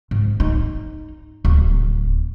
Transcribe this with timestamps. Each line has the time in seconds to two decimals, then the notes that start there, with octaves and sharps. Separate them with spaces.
0.11 G#2
0.40 D#4
1.45 D1